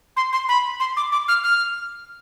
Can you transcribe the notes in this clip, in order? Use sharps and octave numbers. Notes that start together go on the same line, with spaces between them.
C6
C6
B5
C6
D6
D6
F6
F6